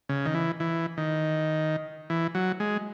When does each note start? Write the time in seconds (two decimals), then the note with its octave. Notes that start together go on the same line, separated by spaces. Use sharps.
0.09 C#3
0.25 D#3
0.34 E3
0.60 E3
0.97 D#3
2.10 E3
2.35 F#3
2.60 G#3